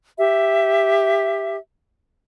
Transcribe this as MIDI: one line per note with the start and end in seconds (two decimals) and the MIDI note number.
0.18 1.56 67
0.18 1.56 76